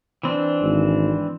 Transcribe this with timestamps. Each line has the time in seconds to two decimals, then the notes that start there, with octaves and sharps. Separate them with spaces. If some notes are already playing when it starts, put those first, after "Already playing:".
0.23 E3 C4 D4
0.62 G#1